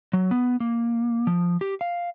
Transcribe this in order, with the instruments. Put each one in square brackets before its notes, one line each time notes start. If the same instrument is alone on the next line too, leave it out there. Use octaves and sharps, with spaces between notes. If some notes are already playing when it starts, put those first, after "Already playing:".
[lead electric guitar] F#3
B3
A#3
F3
G4
F5